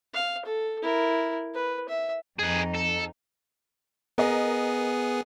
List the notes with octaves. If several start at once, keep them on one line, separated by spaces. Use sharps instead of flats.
F5
A4
E4 A#4
B4
E5
F2 D#4 G#4 B4
A4
B3 G#4 A#4 D#5